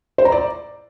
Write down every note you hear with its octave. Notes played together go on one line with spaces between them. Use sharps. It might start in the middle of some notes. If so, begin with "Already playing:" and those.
C5
A#5
D5